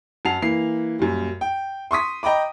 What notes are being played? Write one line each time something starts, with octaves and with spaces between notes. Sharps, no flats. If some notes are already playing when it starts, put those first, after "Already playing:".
F#2 F#5 A5 C7 F7
E3 A#3 C7
F#2 A#2 G3
G5
C6 C#6 D#6 B6
D#5 G5 A#5 B5 D6